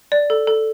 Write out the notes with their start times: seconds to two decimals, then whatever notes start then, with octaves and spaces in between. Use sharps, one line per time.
0.12 D5
0.30 A4
0.47 A4